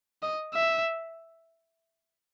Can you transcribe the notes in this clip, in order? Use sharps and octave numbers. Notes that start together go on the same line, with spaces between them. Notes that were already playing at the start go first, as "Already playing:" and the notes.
D#5
E5